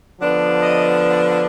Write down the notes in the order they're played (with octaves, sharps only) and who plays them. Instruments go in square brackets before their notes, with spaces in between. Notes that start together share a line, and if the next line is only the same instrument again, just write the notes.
[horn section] D3 F3 B3 D4
D#5